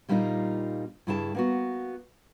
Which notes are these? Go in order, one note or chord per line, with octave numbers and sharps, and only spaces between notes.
A#2 G3 A#3 C4 D#4 F4
G2 C#3 E4 G#4 G5 A5
A#3 B3 F#4